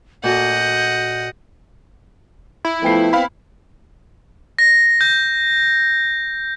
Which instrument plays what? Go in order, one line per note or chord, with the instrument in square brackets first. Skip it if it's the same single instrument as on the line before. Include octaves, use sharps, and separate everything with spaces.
[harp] A#2 F#4 A4 [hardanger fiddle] D#5 F#5 [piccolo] G6
[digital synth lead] E4
[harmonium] F3 A3 [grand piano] B3 G5 C7
[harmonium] C4 [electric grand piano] F5 B5
[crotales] A#6
G6